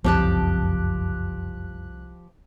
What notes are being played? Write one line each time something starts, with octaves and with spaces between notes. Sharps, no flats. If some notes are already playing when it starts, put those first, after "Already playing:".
F#1 C2 F2 F3 C4 G4 A5 F#6